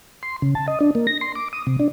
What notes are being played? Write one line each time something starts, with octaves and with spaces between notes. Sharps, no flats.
C6
C#3
A5
D#5
D4
A#3
A#6
C6
D6
D#6
C3
D4